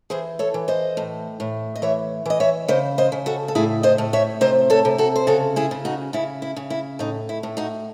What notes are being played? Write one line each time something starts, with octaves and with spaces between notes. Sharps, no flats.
E3 G#4 C5
A4 C#5
E3
C5 D#5
A2
A2
D#5
E3 C#5 E5
E3 D#5
C#5 E5
C#3 C5 D#5
C5 D#5
C#3
F#4 A4
A4
A2 E4 G#4
C5 D#5
A2
C#5 E5
C3 C5 D#5
A4 C#5
C3
F#4 A4
C5
C#3 F#4 A4
E4 G#4
C#3
D#4 F#4
C#3 E4
E4
C#3
E4
A2 D#4
E4
A2
D#4 F#4